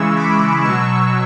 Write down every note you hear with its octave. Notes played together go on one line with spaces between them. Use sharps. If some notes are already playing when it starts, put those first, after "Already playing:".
Already playing: C#3 E3 G#3 C#6 E6
B5 D6
B2 F#3 C#6 E6